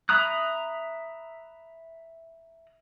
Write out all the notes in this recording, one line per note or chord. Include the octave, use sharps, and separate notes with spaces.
E5 A#5 B5 D#6 F#6